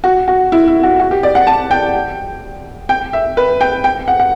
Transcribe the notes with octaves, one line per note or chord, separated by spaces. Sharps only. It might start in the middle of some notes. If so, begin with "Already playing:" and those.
F#4
F#4
E4
E4
F#4
F#4
G4
D5
F#5
A5
G5
G5
E5
B4
G5
G5
F#5
F#5